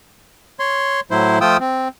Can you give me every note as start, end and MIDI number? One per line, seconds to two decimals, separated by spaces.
0.60 1.00 73
0.60 1.00 84
1.11 1.39 45
1.11 1.39 54
1.11 1.39 64
1.11 1.39 72
1.41 1.57 53
1.41 1.57 57
1.41 1.57 65
1.41 1.57 79
1.41 1.57 87
1.41 1.57 88
1.60 1.88 60